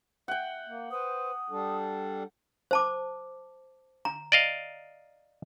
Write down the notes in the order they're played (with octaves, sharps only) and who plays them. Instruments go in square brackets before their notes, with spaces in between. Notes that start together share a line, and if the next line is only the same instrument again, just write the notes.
[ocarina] E5 [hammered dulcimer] F#5 G5
[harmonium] A#3
[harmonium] B4 C5 [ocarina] D#6
[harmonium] G3 D4 A4
[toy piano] C5 A5 D6
A#5
[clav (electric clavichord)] D5 D#5 F5